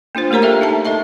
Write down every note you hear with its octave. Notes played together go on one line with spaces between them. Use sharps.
A#3 D4 F4 C5
A3 G4 A#4 C#5 A#5
G4 A4 E5 F5 G5
D#4 E5 A5
A4 D#5 E5 A5